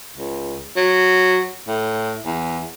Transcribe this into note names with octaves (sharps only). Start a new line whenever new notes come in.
C#2
F#3
A2
E2